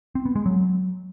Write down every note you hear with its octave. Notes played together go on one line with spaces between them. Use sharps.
C4
B3
G#3
F#3